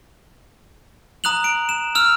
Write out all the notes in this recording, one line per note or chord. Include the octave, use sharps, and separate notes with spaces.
A#5 D#6 F#6 F7 F#7
D7
E7
E6 F6 F7